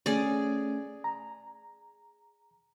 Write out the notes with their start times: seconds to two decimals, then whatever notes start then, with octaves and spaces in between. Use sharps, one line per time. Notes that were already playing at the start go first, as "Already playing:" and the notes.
0.06 A3 C#4 G#4 D5
1.04 A#5